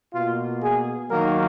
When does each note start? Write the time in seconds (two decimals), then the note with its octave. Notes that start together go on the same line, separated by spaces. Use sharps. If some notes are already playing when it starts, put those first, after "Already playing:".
0.13 B2 A#3 F4
0.62 G#4
1.11 D#3 F#3 A#3 A#4